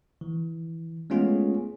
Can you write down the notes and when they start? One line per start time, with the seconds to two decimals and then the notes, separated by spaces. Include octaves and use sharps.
0.21 E3
1.10 G#3 A3 B3 C#4 F4 G#4